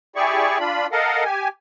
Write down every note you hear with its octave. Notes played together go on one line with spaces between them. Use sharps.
E4 G4 G#4 D5 C#6
D4 F4 B5
A4 A#4 D#5 F5 F#5
G4 G#5